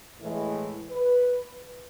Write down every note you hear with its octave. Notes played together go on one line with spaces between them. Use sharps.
A2 E3 G#3
B4